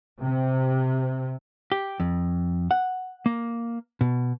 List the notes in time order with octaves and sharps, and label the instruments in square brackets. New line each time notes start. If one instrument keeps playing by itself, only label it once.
[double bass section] C3
[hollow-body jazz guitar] G4
F2
F#5
A#3
B2